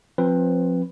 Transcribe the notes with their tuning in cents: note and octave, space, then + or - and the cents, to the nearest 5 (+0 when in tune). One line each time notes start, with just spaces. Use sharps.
F3 +25 C4 +20 B4 +0